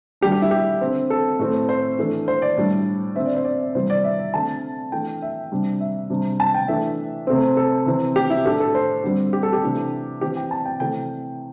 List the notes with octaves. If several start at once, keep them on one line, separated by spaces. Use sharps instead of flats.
D3 G3 D4 G4
G4
E4
G4
D3 C4
A4
A2 A3 C4
C5
E3 A3 D4
C5
D5
A2 G3 D4
D3 C4 E5
D5
C5
D5
C3 E3 G3 C5
D5
E5
E5
D3 A3 C4 A5
E3 A3 D4 G5
E5
C3 G3 D4
E5
C3 G3 D4
A5
G5
E3 A3 D4 E5
C3 A3 C4
A4
C3 E3 C4
G4
E4
A2 A3 D4 G4
A4
C5
D3 G3 C4
G4
A4
G4
C3 E3 A3 D4
E3 C4 G4
G5
A5
G5
C3 E3 A3 G5